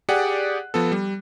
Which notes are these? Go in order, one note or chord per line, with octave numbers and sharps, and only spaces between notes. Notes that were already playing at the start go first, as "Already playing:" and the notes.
G4 G#4 D5 F#5 F#6
F3 B3 A4
G3